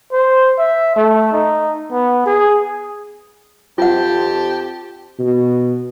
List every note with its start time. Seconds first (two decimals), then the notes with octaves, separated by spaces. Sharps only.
0.12 C5
0.58 E5
0.96 A3
1.33 D#4
1.91 B3
2.26 G#4
3.78 F2 C4 F4 G4 F#5 G5 A5
5.19 B2